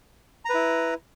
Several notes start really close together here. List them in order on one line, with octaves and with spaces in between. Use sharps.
A#5 B4 E4